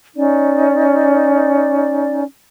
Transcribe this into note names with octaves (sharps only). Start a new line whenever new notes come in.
C#4 D#4 D5